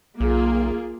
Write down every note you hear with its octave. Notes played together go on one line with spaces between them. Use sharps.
B1 A#3 F4 G#4